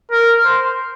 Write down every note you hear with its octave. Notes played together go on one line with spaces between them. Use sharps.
A#4
C5